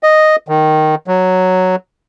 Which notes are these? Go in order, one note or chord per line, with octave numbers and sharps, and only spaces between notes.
D#5
D#3
F#3